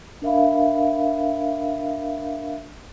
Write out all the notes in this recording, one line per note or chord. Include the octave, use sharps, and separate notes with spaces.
D4 A#4 E5 F5 B5